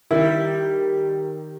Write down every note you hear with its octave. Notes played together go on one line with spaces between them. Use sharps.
D#3 G3 E4